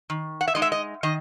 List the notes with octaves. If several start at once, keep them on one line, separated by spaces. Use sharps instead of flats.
D#3
F#5
E5
G#3 D#4 D#5
E5
D#5
D#3 D#5